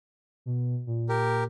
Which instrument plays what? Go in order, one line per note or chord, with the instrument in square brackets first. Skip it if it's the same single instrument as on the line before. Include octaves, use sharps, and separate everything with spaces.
[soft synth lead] B2
A#2
[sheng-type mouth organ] G4 A#4